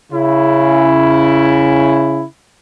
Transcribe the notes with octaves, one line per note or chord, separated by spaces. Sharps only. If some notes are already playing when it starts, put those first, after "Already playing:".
C#3 E4